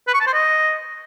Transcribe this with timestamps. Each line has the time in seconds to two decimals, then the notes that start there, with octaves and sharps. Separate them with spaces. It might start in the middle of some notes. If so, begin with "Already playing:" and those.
0.07 B4
0.14 C#6
0.20 A5
0.27 C5
0.33 D#5